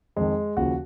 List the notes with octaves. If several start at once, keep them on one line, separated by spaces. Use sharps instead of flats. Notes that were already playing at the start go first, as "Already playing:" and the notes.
F2 D#3 G#3
D#2 C#3 F3 F#4